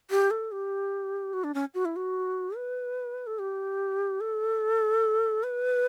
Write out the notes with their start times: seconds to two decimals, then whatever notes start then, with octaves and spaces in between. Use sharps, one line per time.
0.11 G4
0.31 A4
0.52 G4
1.33 F#4
1.44 D4
1.54 C#4
1.74 F#4
1.85 E4
1.96 F#4
2.57 B4
3.27 A4
3.39 G4
4.21 A4
5.43 B4